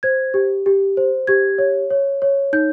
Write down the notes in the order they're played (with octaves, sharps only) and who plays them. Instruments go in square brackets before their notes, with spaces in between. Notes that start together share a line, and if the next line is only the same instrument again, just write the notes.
[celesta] C5 G#6
G4
G4
C5
G4 G#6
C#5
C#5
C#5
D#4 G6